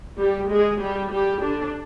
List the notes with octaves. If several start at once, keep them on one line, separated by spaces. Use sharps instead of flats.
G3 G4
G#3 G#4
G3 G4
G3 G4
D3 D4